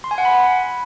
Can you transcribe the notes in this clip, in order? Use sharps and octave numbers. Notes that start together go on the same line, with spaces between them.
C6
G#5
F#5
B5